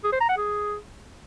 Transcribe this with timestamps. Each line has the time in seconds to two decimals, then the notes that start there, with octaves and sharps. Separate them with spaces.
0.04 G#4
0.12 C5
0.21 A#5
0.29 F#5
0.37 G#4